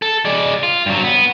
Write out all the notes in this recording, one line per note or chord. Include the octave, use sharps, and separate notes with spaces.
A4
G#3 D5
F4
G2 F#3
B3